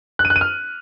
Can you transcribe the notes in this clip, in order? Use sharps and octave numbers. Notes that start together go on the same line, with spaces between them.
F#6
D#7
F#6
D#7
F6